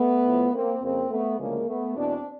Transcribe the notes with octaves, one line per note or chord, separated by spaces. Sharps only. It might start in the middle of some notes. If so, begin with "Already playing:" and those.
Already playing: A3 B3
A2 F3
A#3 C4
F2 C#3 F3 A#3 C4
A3 B3
D2 C#3 F3 G#3 A#3
A3 B3
E2 B2 C4 D4